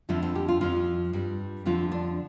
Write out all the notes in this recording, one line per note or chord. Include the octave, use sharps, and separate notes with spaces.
F2 D3 F3 A3
C4
G4
F4
F2 F3 F4
G2 G3
F2 D3 F3 F4
D4